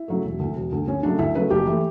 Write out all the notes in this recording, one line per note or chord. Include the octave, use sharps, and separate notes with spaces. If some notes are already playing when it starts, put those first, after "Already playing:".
Already playing: E4
C#3 F#3 A3
E1
D2 D3
E1
D2 D3
D2 C#4
C#3 F#3 A3 D4
D2 E4
C#3 F#3 A3 B4
F#1 G4
E3 A3